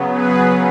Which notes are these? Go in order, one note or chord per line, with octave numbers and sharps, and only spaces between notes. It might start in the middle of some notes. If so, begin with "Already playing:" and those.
Already playing: C#3 F#3 B3
G#4 B4